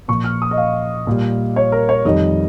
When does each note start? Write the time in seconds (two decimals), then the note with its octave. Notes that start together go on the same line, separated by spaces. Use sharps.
0.08 A#2 F3 C#6
0.24 F6
0.42 D#6
0.51 D#5
0.58 F5
1.07 A#2 G3
1.56 C#5
1.72 A#4
1.89 C#5
2.05 F2 D#3 G3 D#5